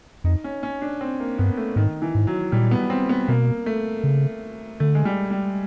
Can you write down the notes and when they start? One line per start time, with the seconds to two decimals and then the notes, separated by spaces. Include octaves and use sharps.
0.24 F2 D#4
0.44 C#4
0.63 C#4
0.82 D4
1.01 C4
1.20 A#3
1.38 G2 B3
1.57 A3
1.76 G#2 D#3
2.02 E3
2.15 G#2
2.27 F#3
2.52 A#2 G3
2.71 B3
2.90 C4
3.09 B3
3.28 B2 A#3
3.66 A3
4.04 C#3
4.80 D3 A3
4.95 G#3
5.05 G3
5.31 G3